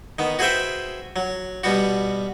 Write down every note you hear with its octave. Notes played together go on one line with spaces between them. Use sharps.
D#3 B3
F#4 G#4 B4 C5 E5 G5
F#3
B2 G3 B3 F#4